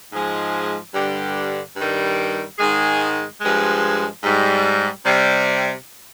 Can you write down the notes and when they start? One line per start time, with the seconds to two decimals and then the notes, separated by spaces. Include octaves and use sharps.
0.11 G#2 F3 G#3
0.94 G2 D3 G3 G4
1.76 G2 D#3 G3
2.58 G#2 D#3 G#3 G#4
3.41 G2 F3 G#3
4.23 G#2 G3
5.06 C3 G3